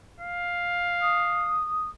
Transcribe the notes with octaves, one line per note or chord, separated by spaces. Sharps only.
F5
D#6